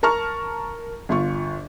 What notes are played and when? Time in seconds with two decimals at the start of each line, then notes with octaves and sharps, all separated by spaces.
0.03 A#4 A5 A#5 C#6 F6
1.09 G1 F4 C#6